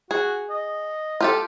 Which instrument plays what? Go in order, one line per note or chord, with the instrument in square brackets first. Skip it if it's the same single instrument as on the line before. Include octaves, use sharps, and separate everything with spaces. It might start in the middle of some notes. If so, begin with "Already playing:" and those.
[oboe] F#4 [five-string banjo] G#4
[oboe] D#5
[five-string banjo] F4 G4 A4